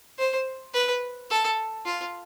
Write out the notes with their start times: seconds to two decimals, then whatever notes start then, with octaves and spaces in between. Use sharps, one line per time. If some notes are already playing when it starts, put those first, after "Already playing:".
0.18 C5
0.74 B4
1.30 A4
1.85 F4